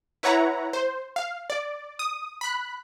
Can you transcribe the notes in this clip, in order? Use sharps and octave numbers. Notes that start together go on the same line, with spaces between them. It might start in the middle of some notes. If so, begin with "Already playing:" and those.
E4 B4 C#5 F#5 A#5
C5
F5
D5
D#6
B5 F#6